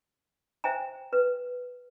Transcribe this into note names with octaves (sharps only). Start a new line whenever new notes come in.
C5 E5 G5 G#5 A#5
B4